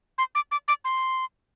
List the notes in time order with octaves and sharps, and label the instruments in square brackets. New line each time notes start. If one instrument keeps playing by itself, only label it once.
[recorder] C6
D6
D6
D6
C6